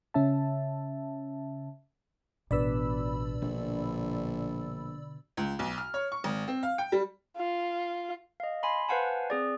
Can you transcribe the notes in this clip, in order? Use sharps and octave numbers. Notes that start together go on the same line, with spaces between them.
C#3 C#4 E5 A5
A1 B2 D4 B4 D5 B5 E6
A#1 D3
C#2
B1
F6
C#5
C#6
G#1
C4
F5
G5
G3
F4
D#5 F5
G#5 B5 C6
B4 C5 F5 F#5 G#5 A5
C4 G#4 D5